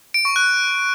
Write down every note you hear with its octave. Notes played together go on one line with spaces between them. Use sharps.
D7
C#6
F#6